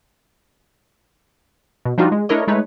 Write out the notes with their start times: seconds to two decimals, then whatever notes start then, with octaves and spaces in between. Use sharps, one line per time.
1.85 B2
1.98 F3 G3 D4 D#4 F4 F#4
2.12 G#3
2.29 A3 D4 E4 A#4 C#5 D#5
2.48 G#3 A3 D#4 B4 C#5